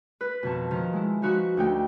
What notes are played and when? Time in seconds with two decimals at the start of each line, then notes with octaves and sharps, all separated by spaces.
0.21 B4
0.43 F2 B2 D#3 F3 A5 C#6
0.71 D#3 F3
0.93 G#3 E4
1.22 F3 D#4 F#4 B4 C#6 F#6
1.57 D2 D#4 F#4 G5